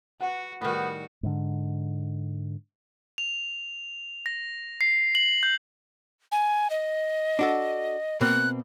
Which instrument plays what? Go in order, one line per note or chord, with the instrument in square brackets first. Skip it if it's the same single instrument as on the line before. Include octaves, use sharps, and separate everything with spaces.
[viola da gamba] F#4 [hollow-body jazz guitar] B4 F#5
[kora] A2 D#3 [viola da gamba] G3 F#4 [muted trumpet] B3
[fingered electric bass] G#2 D3
[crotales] F7
A#6
C7
F#7
G6
[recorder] G#5
D#5
[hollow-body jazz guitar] D4 F#4 A4
[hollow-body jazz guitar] B2 A#3 C4 [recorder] F#6